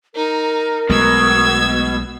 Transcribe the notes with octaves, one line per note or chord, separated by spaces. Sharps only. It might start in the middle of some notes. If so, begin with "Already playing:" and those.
D#4 A#4
B1 B2 G#3 A3 E6 G#6